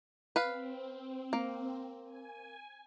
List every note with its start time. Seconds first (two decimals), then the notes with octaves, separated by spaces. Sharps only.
0.36 C4 B4 F5
1.33 A#3
2.04 G#5